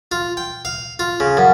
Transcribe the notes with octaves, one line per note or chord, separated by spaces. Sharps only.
F4
G5
F5
F4
C#3
F#2